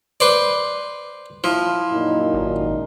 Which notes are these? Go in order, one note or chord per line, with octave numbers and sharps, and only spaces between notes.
B4 C5 D5
F3 E4
F#2 A#2 D#4
G#1